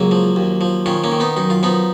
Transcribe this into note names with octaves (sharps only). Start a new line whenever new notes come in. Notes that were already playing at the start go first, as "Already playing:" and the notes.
Already playing: C#2 F#3 A#3
F3
D#2
F3
D#3 C#4 F4
A#3 C#4
D#3
B3 D#4
F#2 D#4
F4
F3 B3 D#4